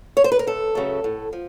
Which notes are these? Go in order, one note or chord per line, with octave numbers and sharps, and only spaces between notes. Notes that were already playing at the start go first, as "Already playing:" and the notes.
C#5
C5
B4
A#4
D#2 A4
C#3 F#3 A3
A2
F3